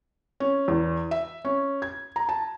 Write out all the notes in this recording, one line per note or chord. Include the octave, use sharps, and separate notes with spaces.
C#4
E2
E5
C#4
G#6
A#5
A5